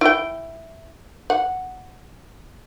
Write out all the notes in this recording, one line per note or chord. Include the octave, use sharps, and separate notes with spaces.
E4 G5
F#5